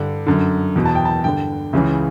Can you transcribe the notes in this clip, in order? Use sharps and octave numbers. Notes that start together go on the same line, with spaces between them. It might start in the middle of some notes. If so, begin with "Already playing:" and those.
Already playing: G2 D3
F#2 D3
E2 B2
A5
G5
A5
G2 D3 G5
C#2 C#3 E3